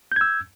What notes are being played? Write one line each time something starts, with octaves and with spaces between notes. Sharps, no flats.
E6 G6 G#6